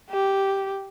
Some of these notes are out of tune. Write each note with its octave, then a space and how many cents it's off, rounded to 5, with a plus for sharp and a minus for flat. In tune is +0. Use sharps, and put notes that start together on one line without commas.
G4 -5